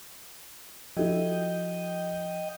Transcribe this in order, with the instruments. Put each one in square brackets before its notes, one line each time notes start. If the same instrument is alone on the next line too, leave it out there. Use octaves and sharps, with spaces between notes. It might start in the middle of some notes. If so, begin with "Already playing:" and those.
[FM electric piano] F3 [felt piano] E4 F#4 A4 [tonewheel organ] D#5 G5